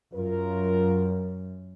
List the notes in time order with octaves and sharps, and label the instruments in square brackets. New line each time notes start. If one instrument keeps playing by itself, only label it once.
[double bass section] F#2 [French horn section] F4 A#4